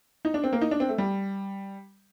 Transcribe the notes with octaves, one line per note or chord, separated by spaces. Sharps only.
D#4
D4
C4
A#3
D#4
D4
C4
A3
G3